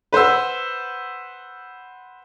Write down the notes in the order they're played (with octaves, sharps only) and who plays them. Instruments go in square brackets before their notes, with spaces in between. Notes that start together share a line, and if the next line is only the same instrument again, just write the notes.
[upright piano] B4 C5 F#5 E6